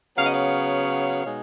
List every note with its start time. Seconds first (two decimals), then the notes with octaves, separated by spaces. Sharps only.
0.17 C#3 F#3 B3 F5
0.25 D#5
0.33 C#5 F5
1.25 B2 G#3 D#4